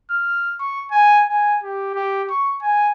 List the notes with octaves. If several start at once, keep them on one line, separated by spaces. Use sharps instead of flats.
F6
C#6
G#5
G#5
G4
G4
C#6
G#5